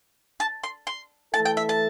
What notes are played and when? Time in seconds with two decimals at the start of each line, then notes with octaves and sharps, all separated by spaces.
0.40 A5
0.63 C6
0.87 C6
1.34 E3 A3 E4 A4 A5
1.45 G5
1.57 E5
1.69 A5